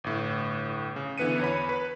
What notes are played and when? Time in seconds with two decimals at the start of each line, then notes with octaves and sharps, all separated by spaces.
0.04 G1 A2
0.96 C#3
1.18 D3 E3 B3 B4 C#7 D#7
1.39 E2 C#5 B5
1.69 B4